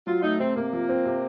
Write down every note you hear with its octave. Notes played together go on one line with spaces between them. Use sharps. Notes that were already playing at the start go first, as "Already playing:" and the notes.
F#3 F4
A3 D#4
C3 C4
C3 A#3
F3
C4
C3